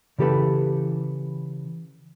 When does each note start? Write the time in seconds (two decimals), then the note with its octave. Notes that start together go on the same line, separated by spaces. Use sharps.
0.19 C#3 E3 G4 A4 B4